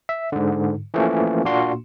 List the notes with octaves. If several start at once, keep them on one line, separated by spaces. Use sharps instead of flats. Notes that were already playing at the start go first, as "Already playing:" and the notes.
E5
G#2 D3
E3 F3 A3 A#3 C#4
A#2 A#3 D4 F#4 C6